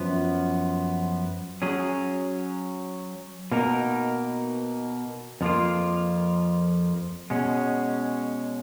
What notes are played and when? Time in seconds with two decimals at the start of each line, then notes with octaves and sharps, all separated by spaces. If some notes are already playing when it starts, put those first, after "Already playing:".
Already playing: F#2 F3 B3
1.62 F#3 C#4 G#4
3.52 B2 A#3 D#4 A#4
5.41 F2 F3 A#3 F4
7.30 B2 G#3 C#4